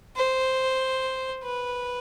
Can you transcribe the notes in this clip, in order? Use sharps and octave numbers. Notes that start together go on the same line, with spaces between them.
C5
B4